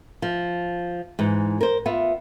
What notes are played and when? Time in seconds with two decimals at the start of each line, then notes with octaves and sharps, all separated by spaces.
0.22 F3
1.19 G#2 E3
1.61 A#4 C5
1.86 B3 F4 E5